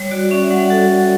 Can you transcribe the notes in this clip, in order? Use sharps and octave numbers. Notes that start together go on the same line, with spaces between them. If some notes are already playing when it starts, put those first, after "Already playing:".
Already playing: G3 C#5
F#4 D5
C#4 E5
G3 F#5
F#4 A4
C#4